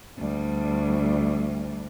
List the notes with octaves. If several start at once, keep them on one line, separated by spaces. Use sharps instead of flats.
D2 G3